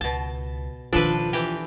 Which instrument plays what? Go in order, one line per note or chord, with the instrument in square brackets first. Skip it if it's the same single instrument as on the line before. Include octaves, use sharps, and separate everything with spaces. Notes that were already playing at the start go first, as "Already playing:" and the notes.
[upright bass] C#2 [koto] B2 A5
[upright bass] B2 D#3 [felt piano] F3 [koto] D4 A4 B4
[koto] E3 G4